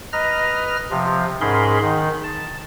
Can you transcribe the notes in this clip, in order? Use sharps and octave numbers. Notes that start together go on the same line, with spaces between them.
B4 D#5 A#5 F6 A#6
C3 F3
G#2 C#4 G#4 A#4 B5 C6
D#3 D#4
A5